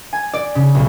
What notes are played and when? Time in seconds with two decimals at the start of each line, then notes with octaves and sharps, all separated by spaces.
0.13 G#5
0.34 D5
0.55 C#3
0.75 B1